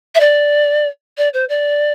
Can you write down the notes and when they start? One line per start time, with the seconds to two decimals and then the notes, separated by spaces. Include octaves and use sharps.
0.15 E5
0.20 D5
1.17 D5
1.33 C5
1.49 D5